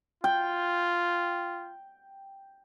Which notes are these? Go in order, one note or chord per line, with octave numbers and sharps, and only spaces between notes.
F4 G5